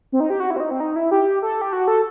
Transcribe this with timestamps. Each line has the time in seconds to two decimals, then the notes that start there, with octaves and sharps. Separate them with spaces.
0.12 C4
0.20 D#4
0.30 G4
0.40 F#4
0.50 E4
0.56 C4
0.60 D#4
0.71 C4
0.80 D#4
0.96 E4
1.11 G4
1.42 A4
1.61 G4
1.73 F#4
1.88 A4